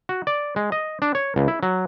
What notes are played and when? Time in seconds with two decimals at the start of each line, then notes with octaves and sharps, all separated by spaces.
0.09 F#4
0.27 D5
0.56 G#3
0.72 D#5
1.02 D4
1.15 C#5
1.36 C#2
1.48 E4
1.63 F#3